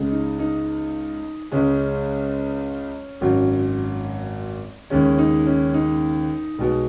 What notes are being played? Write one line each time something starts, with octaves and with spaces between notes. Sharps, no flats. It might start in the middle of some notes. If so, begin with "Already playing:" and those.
Already playing: C#2 C#3 G#3
D#4
D#4
C#2 C#3 G#3 C#4
G#1 F#2 F#3
D#2 C#3 G#3 C#4
D#4
C#4
D#4
B1 B2 G#3